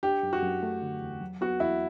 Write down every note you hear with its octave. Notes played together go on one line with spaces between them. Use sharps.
D4 G4
F#2
F#4
F#2
A3
D3
E2
F#3
B3 F#4
E2 E4